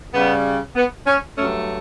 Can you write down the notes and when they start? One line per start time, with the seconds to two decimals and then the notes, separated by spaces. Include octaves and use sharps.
0.14 C#3 G3 B3
0.76 B3
1.06 C#4
1.37 G2 F#3 A3 C#4